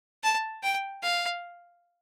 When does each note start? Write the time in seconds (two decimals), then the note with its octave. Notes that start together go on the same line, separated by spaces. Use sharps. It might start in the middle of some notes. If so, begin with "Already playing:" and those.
0.24 A5
0.63 G5
1.03 F5